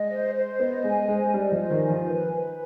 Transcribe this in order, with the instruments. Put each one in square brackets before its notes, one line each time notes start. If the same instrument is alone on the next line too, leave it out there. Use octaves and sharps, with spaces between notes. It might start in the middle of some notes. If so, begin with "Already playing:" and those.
Already playing: [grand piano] G#3 [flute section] D#5
[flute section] C5
C5
[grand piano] B3 [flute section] D#5
[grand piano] G#3 [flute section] G#5
[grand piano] G#3 [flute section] C5
[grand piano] G3 [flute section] D#5
[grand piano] F3
[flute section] C5
[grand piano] D#3
[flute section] G#5
[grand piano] F3
[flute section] B4
B4